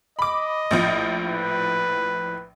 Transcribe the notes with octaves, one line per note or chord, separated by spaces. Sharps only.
D#5 B5 D6
A#1 A2 F3
B4